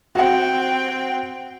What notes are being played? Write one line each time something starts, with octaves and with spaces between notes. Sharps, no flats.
C4 F#4 F#5 G5